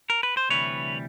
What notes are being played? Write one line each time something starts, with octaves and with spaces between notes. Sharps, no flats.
A#4
B4
C5
D2 C3 E3 G3 B4 C#5